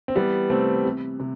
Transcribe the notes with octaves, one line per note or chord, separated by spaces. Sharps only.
C4
E3 G3 B3
C3 A3 C4
C3
C3